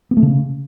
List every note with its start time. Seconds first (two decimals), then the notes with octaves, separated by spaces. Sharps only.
0.11 B3
0.17 A3
0.22 C#3